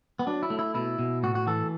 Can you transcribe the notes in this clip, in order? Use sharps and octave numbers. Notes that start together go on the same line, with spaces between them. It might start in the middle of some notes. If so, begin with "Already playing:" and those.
B3
F#3 D4
E4
A3
E4
B2 E4
B2
A2 F#4
F#4
E3 A4